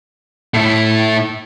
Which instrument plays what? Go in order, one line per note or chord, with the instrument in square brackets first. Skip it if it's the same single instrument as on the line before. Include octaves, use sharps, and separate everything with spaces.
[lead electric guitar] A2 E4